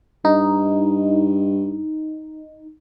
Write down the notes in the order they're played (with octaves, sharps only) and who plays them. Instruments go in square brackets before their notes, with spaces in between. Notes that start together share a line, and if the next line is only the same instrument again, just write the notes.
[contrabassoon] G2 [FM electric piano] D#4